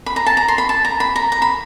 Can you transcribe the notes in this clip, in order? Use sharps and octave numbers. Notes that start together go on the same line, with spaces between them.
B5
A#5
A5
A#5
C6
B5
A5
A#5
B5
A#5
A#5
B5